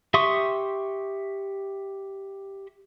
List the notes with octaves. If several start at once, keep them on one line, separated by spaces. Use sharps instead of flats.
G4 E5 C6 C#6 D#6